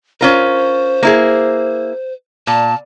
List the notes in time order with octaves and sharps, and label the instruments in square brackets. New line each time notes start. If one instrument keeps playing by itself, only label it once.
[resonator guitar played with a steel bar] C#4 F4 A#4 [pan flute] C5
[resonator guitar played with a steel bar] A#3 E4 G#4
[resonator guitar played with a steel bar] A#2 [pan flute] A5